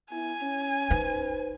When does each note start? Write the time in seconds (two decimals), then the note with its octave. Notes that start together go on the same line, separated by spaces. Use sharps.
0.11 B3 E4 G#5
0.42 C#4
0.91 D#4 B4 C5